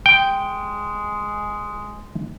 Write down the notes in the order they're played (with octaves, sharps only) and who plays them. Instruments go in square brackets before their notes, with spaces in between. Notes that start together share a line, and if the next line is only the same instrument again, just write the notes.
[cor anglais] G#3 [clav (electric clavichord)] G5